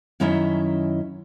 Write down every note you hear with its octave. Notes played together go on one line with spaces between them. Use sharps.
F#2 D#3 C#4 E4 D#5 E5